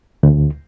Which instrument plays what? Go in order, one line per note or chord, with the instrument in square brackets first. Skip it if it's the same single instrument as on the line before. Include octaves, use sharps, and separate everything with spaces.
[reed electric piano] D2